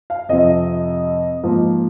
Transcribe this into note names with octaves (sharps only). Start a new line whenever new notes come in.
F5
F2 C3 F3 D#5
G#2 F3 A#3